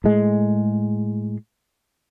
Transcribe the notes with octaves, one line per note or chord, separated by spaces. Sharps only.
A2 G#3